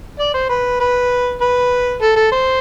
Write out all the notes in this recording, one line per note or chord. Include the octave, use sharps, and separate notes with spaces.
D5
C5
B4
B4
B4
A4
A4
C5